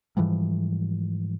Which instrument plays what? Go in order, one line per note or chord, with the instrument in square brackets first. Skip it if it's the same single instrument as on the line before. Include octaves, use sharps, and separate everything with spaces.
[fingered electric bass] G#2 E3 F3 G3